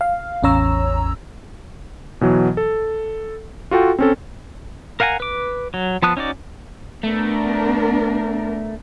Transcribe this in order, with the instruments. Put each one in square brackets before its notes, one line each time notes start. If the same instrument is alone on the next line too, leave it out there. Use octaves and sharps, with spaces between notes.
[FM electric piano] F5
A1 E2 C#4 C#5 A#5 E6
[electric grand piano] B2 E3 F#3
A4
F4 F#4 A4 G5
C4 C#4 A4
[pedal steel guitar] A#4 F5 F#5 G#5 A#5
B4 D6
F#3
F3 B3 A5 D#6 F#6
C#4 D#4 F#4 D5
[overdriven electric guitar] A3 [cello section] B3 D4 A#4